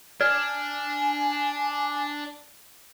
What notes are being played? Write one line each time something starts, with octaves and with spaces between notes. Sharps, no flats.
D4 D5 G#5 F6